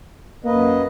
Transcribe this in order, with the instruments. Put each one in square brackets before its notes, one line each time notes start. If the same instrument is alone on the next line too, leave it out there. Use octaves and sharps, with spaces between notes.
[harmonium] F#2 B4 D#5 [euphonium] A#3